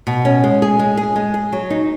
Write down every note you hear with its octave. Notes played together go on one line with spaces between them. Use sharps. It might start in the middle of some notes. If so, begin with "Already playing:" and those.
B2
C#4
G#3
G#4
G#3
G#4
G#3
G#4
F#3
D#4